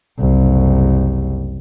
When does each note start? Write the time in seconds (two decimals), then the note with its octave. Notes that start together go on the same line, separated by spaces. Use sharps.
0.20 F#1 C2